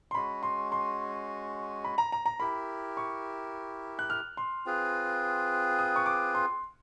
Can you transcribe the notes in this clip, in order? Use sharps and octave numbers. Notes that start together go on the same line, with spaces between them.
C6
G#3 C#4 F#4 B5
C6
C6
B5
A#5
A#5
A#5
E4 G4 A#4 B5
C#6
F#6
F6
C6
C4 F4 G#4 B4
D#6
C#6
D6
C6